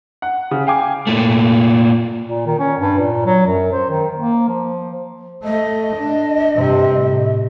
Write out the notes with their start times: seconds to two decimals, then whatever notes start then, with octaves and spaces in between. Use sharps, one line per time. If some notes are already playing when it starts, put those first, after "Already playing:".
0.22 F#5
0.51 C#3
0.67 F5 G5 G#5 D6
1.07 A#2 A3
2.30 A#2
2.47 D#3
2.59 C#4
2.79 G2
2.98 A#2
3.26 F#3
3.47 F#2
3.72 C5
3.91 D#3
4.16 A#3
4.48 F3
5.44 A3 D#5
5.97 D4
6.54 G2 C3
6.94 A2